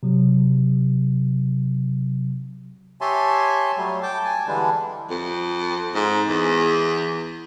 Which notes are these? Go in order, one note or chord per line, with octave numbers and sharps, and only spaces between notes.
C3 F#3
G4 C#5 E5 G#5 A5 C6
F#3 G3 A3
G5 A5 D6
G#5 A5
D3 E3 G3 G#3 D4
F2
G#2
E2